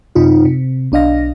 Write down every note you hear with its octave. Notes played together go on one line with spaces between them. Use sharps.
F#2 C3 D#4 F4
C3
B1 D4 D#5 F5 A#6